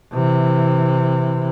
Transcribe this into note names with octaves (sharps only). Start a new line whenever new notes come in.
C3 E3